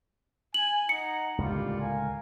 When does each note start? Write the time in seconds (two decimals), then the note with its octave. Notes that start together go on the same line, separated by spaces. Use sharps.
0.54 G#5 F#7
0.89 D#4 F#5 A#5 C#7
1.38 C#2 A2 D3 G3 A#3 F4
1.81 A#4 F5 G#5